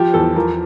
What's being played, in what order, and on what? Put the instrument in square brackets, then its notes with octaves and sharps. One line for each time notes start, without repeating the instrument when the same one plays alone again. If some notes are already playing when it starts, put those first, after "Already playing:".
Already playing: [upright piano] F3 G4
E2 A4
F3 A#4